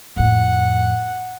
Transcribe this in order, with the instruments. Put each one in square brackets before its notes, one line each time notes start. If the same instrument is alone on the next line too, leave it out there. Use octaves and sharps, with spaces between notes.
[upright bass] F2 A2 [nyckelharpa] F#5